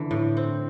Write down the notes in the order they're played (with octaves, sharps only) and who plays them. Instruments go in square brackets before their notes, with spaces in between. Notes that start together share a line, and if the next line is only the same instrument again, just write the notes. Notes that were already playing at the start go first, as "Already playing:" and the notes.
Already playing: [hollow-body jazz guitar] D3 [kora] E3
[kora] A2
C4